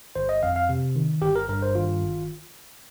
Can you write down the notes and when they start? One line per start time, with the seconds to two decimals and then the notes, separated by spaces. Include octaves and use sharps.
0.16 G1 C5
0.29 D#5
0.43 F2 F5
0.56 F5
0.69 C3
0.96 D#3
1.22 G1 G4
1.36 A#4
1.49 G2 A#4
1.62 C5
1.75 D#3 F4
2.02 G1